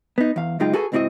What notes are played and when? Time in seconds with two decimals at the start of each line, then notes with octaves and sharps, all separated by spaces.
0.18 B3 D#4
0.36 E2 F5
0.60 C#2 F#2 G#3 D#4 F4 G5
0.73 F#4 G#4 A4 B4 G#5
0.92 C#2 G#2 C4 E4 F#4 D#5